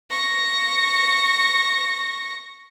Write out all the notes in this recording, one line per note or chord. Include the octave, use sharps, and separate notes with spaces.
C#6 A#6